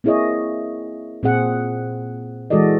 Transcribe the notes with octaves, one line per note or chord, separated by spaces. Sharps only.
A#3 C4 E4 G#4 C#5 D#5
A#2 C4 G#4 F#5
E3 G#3 F#4 A4 D5 D#5